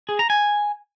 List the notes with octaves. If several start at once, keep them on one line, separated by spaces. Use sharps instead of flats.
G#4
A#5
G#5